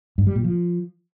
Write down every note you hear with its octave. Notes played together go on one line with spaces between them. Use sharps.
G2
G3
A#2
F3